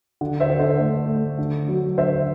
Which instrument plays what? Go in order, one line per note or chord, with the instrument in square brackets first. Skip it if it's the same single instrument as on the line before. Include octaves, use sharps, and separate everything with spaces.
[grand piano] D3
C5 E5
D3
A4 C5
A3
A3
D3
F#3
D3 C5 E5